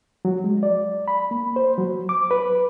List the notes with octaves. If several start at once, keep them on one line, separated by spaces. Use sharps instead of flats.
F#3
G#3
D5
B5
A#3
C5
F#3
D6
B4